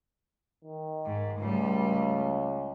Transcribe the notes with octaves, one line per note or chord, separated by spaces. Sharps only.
D#3
G#2
C#2 A2 G3